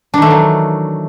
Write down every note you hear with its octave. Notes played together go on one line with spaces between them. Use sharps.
D#3 E3 F#3 A3 D4